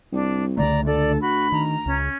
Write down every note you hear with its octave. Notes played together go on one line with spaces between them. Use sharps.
C2 D4
C#2 D3 A3 D5 A#5
D2 A4 D5
F#4 B5
D#3 A#5
C#2 C#4